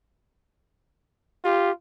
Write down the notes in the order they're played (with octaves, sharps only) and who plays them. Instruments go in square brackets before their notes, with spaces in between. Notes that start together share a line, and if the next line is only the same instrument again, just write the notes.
[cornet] F4 [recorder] G4